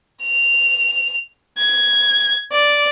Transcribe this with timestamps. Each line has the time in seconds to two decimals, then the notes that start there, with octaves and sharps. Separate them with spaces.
0.23 F7
1.58 G#6
2.52 D5